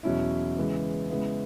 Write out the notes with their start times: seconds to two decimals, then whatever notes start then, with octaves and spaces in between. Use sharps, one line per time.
0.03 E2 B2 F#3 C#4 E4
0.56 C#3 E3 G#3 B3
1.10 C#3 G#3 B3 E4